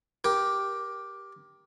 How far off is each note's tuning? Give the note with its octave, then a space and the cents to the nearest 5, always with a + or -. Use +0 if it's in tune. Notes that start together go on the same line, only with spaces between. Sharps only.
G4 +0 A#4 +20